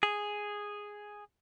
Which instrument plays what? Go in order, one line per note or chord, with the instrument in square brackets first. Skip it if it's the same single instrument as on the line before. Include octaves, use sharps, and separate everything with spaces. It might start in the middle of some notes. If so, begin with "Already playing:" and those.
[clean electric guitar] G#4